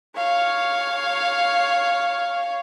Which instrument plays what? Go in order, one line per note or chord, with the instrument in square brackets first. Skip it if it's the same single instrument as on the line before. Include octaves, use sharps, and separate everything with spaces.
[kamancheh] C#5 F5